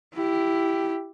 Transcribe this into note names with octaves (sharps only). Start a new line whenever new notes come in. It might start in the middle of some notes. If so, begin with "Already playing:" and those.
E4 G4